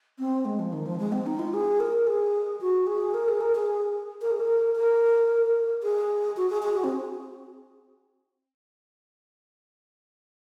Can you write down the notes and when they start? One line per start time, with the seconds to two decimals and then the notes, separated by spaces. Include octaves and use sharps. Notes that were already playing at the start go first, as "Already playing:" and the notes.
0.19 C4
0.45 G#3
0.59 F3
0.73 D#3
0.86 F3
1.00 G#3
1.12 C4
1.26 D#4
1.39 F4
1.54 G#4
1.80 A#4
2.07 G#4
2.61 F#4
2.87 G#4
3.14 A#4
3.28 G#4
3.41 A#4
3.55 G#4
4.22 A#4
4.31 G#4
4.40 A#4
4.75 A#4
5.83 G#4
6.37 F#4
6.50 G#4
6.63 G#4
6.77 F#4
6.84 C4